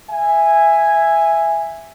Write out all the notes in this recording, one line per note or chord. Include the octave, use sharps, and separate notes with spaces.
E5 G#5